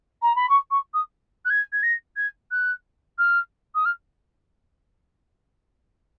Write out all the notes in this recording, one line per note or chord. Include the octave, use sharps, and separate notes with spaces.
A#5
B5
C#6
C#6
D#6
F#6
G#6
G#6
A#6
G#6
F#6
F6
D#6
F6